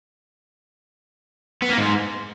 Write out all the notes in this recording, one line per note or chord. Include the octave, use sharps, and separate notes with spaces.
B3
A#3
G#2